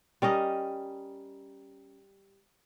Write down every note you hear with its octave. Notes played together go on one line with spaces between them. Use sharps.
G3 C#4 A#4 D#5